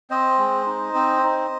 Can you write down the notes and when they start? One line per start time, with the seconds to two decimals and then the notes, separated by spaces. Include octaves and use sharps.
0.10 C4 C5 D#5
0.38 G#3
0.66 D#4
0.95 C4
1.23 D#4